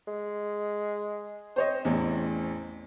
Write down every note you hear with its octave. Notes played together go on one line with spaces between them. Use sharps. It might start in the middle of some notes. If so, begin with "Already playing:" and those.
G#3
C4 C5 C#5 D#5
A1 E2